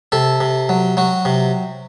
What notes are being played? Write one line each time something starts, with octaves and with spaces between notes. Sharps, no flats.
C3 A4
C3
F#3
F#3 F#4
C3